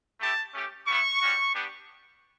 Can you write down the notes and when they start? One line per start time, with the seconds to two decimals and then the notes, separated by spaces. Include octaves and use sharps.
0.20 A3 E4 G4 A5
0.53 A3 C#4 G4
0.87 G3 B3 E4 C#6
1.20 G3 C#4 F#4
1.54 B3 D4 G4